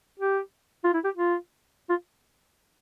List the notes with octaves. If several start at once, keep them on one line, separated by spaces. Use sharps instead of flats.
G4
F4
E4
G4
F4
F4